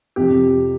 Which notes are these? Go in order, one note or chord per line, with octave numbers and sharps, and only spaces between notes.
F2 C3 F3 G4